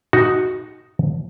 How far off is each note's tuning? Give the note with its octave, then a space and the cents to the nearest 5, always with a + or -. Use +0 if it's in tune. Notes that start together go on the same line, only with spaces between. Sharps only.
D#4 +0 F#4 +0